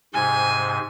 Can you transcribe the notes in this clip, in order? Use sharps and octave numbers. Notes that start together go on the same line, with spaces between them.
G#2 C3 G#5